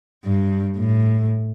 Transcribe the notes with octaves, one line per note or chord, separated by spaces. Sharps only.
G2
A2